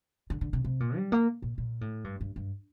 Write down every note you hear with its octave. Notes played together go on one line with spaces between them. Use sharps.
D3
D3
C3
C3
A#2
G3
A#3
A#2
A#2
A2
G2
G2
G2